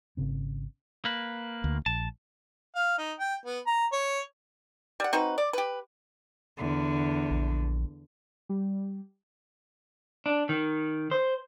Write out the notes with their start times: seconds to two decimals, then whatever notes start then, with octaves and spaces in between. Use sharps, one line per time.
0.17 G#1 C#3 C4
1.05 A#3 B4
1.64 D2
1.86 A#1 A5
2.76 F5
2.98 D#4
3.19 G5
3.45 B3
3.67 A#5
3.92 C#5
5.00 G3 F#5
5.13 C4 D#4 F#4 B4
5.38 D5
5.53 G4 B4
6.57 E2 D3
7.30 A#1
8.49 G3
10.26 D4
10.49 D#3
11.11 C5